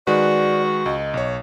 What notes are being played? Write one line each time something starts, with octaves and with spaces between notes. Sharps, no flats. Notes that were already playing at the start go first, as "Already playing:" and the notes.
D#3 G#3 F#4 B4 D5
C#2 D#5
B1 C#5